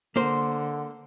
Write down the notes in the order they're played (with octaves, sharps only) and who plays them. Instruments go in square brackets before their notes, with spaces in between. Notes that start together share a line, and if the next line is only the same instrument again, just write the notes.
[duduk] D3 [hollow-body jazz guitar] A#3 C5